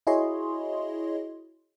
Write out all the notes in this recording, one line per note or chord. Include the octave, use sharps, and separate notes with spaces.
E4 F#4 G#4 C#5 D#5 C6